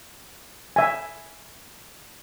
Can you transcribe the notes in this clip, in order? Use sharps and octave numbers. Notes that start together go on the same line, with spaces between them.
E5 G#5